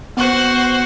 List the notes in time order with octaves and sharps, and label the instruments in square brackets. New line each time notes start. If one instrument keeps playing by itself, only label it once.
[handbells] B3 F#6 [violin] F#4 C5